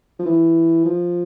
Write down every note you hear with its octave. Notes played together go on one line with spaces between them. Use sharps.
F3
E3
F3